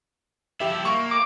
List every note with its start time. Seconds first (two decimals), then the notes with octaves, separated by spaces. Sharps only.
0.60 F3 E4 G4 E5
0.85 A#3 C#6
1.11 D6